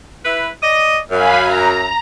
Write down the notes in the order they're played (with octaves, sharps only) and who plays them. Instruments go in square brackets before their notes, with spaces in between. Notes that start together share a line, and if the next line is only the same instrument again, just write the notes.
[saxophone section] E4 B4
D5 D#5
[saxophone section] F#2 [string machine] F5 G#5 B5
[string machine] A#5